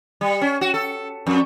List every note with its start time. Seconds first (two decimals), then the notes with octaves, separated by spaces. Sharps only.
0.21 G3
0.41 C#4
0.61 F#4
0.74 A4
1.27 F2